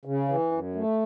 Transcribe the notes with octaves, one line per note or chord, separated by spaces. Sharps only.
C#3
E3
F#2
A3